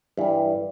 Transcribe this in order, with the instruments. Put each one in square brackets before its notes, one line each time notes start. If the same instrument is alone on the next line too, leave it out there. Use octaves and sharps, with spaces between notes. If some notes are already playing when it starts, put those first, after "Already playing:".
[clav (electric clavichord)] G2 E3 G3